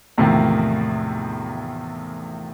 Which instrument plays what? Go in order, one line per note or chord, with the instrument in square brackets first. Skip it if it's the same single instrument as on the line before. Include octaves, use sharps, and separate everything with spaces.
[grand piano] E2 A2 C3 D#3 F3 A#3